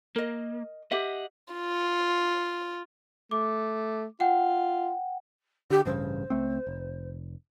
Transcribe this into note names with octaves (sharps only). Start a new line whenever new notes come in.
A#3 A#4 D#5
G4 D#5 E5 F#5
F4
A3 D6
F4 F#5 G5
D3 G4
A1 G2 C#3 C5
C#2 A3 C4
F1